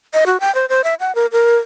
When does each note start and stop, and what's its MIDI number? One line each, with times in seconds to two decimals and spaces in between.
0.14 0.24 75
0.26 0.40 66
0.40 0.53 79
0.55 0.66 72
0.69 0.82 72
0.84 0.94 76
1.00 1.15 78
1.15 1.26 70
1.32 1.57 70